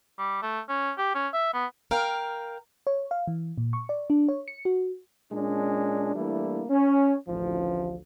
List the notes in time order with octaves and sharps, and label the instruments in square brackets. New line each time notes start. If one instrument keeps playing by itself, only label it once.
[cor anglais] G3
A3
C#4
G4
C#4
E5
B3
[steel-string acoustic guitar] A#4 F5 G5
[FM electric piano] C#5
F5
E3
A#2
C#6
D5
D4
C#5
C#7
F#4
[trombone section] A#2 G#3 C#4 D4
E3 G3 A3 A#3 D4 E4
C#4
A1 D2 F3